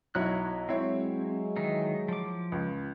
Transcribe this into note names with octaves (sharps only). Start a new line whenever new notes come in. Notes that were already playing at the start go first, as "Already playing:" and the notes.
B1 F#3 E4 C#5 B5 F#6
F#3 G#3 C4 E4 C#5
D#3 E3 D#4
F3 D6
C#2